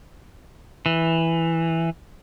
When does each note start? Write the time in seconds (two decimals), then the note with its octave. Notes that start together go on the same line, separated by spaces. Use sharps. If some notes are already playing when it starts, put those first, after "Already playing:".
0.86 E3